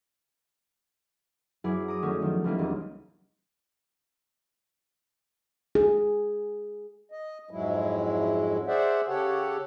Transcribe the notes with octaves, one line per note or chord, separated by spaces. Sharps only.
F#2 F#3 E4 G#4 B4 D6
A#5 D6 D#6
D#3 F#3 A3 C#4
D#3 F3
C#2 E3 G3 G#3 A#3
E1 D#5
G#4
D#5
F2 G#2 F#3 G#3 E4
G#4 C5 D5 E5 F#5
C#3 G4 A4 C#5 F#5